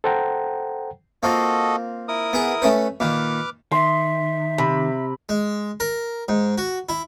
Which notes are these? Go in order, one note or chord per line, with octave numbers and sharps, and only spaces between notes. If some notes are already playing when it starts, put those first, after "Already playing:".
A4 C5 F#5 G5 A#5
A#3 C4 F4 F#4 A4 D#5
E4 A#4 D#6
B3 G#4
A3 C#4 B4
A#2 D#3 B4 D6 F6
D#3 E5 C6
C3 B5
G#3
A#4
G#2
F#4
E4